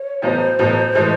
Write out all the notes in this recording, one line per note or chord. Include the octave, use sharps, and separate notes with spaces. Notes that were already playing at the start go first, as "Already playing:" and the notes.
Already playing: C#5
A1 A2 F#3 B3 C5
A1 A2 F#3 B3
A2 E3 G#3